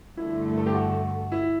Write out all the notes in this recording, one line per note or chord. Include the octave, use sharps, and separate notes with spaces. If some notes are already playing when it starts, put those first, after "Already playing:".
G2 D3 A3 E4
A4
G4
F#4
E4